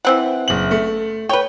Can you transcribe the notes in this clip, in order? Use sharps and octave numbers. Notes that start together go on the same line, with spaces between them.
E3 C4 F#5
F#1 F#7
A3
B4 C#5 G5